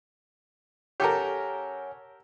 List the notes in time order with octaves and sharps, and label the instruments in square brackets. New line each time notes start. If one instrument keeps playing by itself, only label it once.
[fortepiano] G4 A4 A#4 [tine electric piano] C#5 F#5 G#5